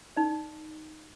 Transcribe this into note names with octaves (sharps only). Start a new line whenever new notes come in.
D#4 D5